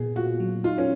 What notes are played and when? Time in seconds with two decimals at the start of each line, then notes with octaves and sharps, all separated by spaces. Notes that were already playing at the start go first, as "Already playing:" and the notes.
Already playing: A#2 A#3 B3 G#4
0.16 F4 F#4
0.40 F#3
0.64 D#4 F4
0.78 C#4